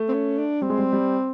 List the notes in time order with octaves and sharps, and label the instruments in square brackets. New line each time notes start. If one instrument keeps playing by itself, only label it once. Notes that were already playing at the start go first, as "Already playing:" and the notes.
Already playing: [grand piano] A3
[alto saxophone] C4
C#4
D4
[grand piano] G3 [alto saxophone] C4
[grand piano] G#3
G3
G3